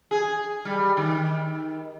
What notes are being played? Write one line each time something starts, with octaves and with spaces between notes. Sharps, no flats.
G#4
G3
D#3